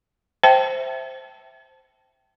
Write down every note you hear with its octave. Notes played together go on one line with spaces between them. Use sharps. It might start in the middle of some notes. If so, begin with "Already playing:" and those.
C5 E5 G5 A5